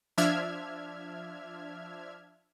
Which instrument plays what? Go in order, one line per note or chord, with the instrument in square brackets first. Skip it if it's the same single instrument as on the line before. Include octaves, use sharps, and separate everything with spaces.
[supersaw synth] F3 D4 E5 F6 G#6